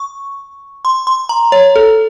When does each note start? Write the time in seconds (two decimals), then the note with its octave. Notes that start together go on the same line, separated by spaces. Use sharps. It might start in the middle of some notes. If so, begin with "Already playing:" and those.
Already playing: C#6
0.85 C6
1.07 C6
1.29 A#5
1.52 C#5
1.76 A4